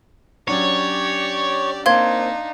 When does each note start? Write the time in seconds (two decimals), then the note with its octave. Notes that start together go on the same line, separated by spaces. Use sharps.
0.48 F#3 C#4 D4 G4 C#5 D5
1.86 A#3 C4 D4 D#4 F5 C6 G#6